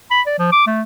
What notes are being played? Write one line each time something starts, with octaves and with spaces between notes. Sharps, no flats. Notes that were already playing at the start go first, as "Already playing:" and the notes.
B5
D5
F3
D6
A3